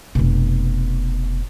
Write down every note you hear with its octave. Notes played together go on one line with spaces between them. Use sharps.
F1 B2